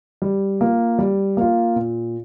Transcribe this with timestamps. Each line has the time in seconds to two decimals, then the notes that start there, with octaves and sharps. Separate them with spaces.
0.22 G3
0.61 A#3 F4
0.99 G3
1.37 A#3 F4
1.76 A#2